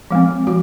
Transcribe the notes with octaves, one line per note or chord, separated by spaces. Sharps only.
F3 G#3 C4
F3 F#4